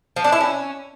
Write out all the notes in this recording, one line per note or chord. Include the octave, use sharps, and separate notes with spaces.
F3
D4
E4
C#4